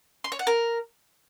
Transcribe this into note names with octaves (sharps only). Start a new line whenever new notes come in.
C6
C#5
F#5
A#4